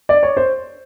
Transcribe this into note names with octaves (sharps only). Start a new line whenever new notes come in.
D5
C#5
C5